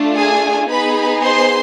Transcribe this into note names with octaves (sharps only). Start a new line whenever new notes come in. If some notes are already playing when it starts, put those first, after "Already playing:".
Already playing: A3 D4 F4
G#4 G#5
B3 D#4 G#4 B4 B5
C5 C6